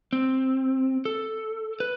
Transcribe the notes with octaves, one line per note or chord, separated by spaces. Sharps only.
C4
A4
B4